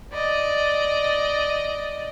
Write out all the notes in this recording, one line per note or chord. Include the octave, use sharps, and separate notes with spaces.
D5 D#5